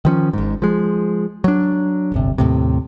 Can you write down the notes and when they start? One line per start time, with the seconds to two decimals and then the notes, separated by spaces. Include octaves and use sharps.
0.05 D#3 F3 C#4
0.33 G#1 G#2
0.62 F3 G#3
1.44 F#3 D4
2.12 D1 G1 C3
2.38 D#2 A2 C3